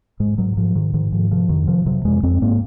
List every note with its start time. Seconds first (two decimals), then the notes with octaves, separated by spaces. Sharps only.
0.20 G#2 G#3
0.38 G#2 F#3
0.57 G#2 F3
0.75 G#2 D#3
0.94 G#2 D#3
1.12 G#2 F3
1.31 C3 F3
1.49 F2 D#3
1.67 C3 F3
1.86 C3 F#3
2.05 F2 G#3
2.23 F2 C4
2.42 G#2 A#3